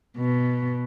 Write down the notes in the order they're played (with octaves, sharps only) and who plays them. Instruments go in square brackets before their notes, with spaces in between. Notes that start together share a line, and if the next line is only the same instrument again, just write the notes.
[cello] B2